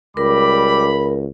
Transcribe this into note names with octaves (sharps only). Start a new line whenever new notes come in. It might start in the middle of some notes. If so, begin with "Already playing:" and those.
C#2 G3 A#4 B5 D6